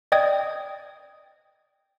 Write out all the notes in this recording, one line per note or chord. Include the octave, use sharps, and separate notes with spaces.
D5 D#5 G5 D#6 G#6